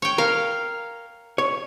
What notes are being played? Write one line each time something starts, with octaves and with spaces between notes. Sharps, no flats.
C#5 G5
A#4 F5
C#5